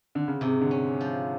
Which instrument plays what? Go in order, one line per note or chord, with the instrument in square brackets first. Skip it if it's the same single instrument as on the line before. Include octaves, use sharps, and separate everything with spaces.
[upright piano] D3
C#3
[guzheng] G#2 [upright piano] C3
[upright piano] D3
[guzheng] C#4
F3